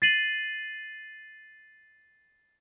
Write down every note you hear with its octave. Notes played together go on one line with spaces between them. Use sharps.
A6 C7 D#7 F#7